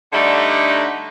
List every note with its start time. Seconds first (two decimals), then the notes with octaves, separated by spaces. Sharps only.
0.13 D3 G3 A3 D4 D#4